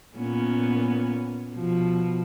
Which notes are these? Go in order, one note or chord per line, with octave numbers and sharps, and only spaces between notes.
A#2 B3 C#4
B2 F3